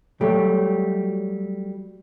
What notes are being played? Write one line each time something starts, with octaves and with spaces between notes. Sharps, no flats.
F#3 G3 A3 G4